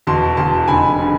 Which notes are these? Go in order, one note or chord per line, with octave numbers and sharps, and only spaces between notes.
E1 E2 B2 A5 C6
E1 E2 B2 A5 C6
F1 F2 D3 G#5 B5
D3